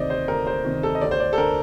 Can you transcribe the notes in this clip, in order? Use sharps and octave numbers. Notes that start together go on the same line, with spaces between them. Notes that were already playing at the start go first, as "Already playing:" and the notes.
Already playing: D2 C3 D#3 C5 D5 D#5
C5
D2 A#4
C5
C3 D#3
A4
D#5
D2 D5
C5
D5
A4
D3 A#4